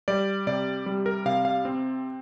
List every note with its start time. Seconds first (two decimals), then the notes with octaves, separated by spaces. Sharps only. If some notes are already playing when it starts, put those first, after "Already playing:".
0.08 G3 D5
0.47 C3 D5
0.86 G3
1.06 A#4
1.26 C3 F5
1.45 F5
1.65 C4